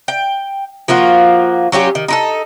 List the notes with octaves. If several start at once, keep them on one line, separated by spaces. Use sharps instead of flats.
G5
F3 A#3 F4 F#4
F#3 C#4 F4 G4
D#3
D#4 E4 A4